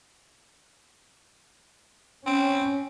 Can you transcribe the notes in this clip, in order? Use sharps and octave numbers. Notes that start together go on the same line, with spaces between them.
C4 C#4